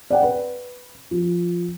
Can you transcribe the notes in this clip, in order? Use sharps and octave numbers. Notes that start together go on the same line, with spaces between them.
D5 F#5 G5
B4
F3